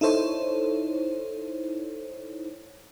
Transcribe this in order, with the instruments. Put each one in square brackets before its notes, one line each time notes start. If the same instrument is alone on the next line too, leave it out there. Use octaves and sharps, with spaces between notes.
[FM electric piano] D#4 E4 A4 C5 C#5